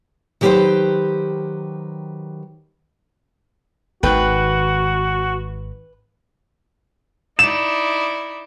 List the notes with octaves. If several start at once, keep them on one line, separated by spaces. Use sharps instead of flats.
D#3 F#3 G4 G#4 B4 C5
G#1 G#2 D#3 F#4 B4 G5
D#4 E4 D5 E7